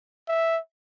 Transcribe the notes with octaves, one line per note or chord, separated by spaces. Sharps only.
E5